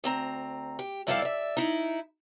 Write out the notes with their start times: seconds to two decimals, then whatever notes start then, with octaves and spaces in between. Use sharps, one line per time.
0.04 D2 C4 A#5
0.79 G4
1.07 F2 G3 E4 A4 D5 F5
1.22 D5 E5
1.57 D#4 E4